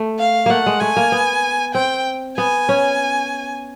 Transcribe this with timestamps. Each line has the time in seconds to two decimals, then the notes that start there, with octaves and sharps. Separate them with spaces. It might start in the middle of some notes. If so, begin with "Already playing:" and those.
Already playing: A3
0.19 F5
0.46 A3 A#3 F#5
0.66 G#3
0.81 A3 G#5
0.97 A#3
1.12 B3
1.75 C4 G5
2.37 B3 G#5
2.69 C#4